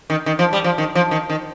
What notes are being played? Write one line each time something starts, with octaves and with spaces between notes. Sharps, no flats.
D#3
D#3
F3
G3
F3
D#3
F3
D#3
D#3